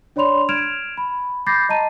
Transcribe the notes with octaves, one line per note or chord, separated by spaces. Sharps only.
D4 C#5 D5 B5 C6 F7
F6 G#6 D7 E7 F7
B5
B5 D6 G6 A6 A#6 C7
D#5 A5 A#5 D#7